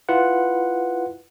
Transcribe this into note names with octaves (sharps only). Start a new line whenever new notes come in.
E4 F4 B4 F#5